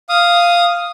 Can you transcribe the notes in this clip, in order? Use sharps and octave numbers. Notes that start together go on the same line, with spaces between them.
F5 D#6